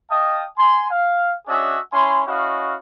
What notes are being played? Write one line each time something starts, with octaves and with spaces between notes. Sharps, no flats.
D#5 F5 G5 A5 D#6
G#5 C6
F5
C#4 D4 F#4 G#4 D#5 E5
C#4 E4 G#5 C6
C#4 E4 F#4 D#5 F5